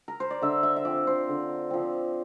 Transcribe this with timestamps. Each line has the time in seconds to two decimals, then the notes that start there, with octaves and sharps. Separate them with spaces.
0.08 A#4
0.20 C5
0.30 D5
0.42 D3 E5
0.63 E5
0.76 E5
0.85 F3 C4 D5
1.07 C5
1.29 D3
1.70 F3 C4